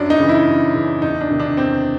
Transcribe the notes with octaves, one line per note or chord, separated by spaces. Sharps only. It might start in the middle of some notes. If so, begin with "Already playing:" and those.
Already playing: F#2 D4
D#4
C#3 E3
E4
F#2
C#3 E3
E2 D#4
D4
C3 D#3
D4
E2 C4